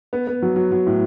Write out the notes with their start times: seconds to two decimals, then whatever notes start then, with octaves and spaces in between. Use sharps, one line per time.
0.13 B3
0.27 B3
0.42 F#3
0.56 F#3
0.72 F#3
0.87 A2